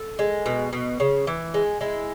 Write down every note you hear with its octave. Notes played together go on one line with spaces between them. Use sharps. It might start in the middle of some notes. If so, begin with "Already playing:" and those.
Already playing: A4
G#3
B2
B2
C#3
E3
G#3
G#3 E4